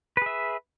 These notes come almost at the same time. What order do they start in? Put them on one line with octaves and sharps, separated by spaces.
B4 G#4 E5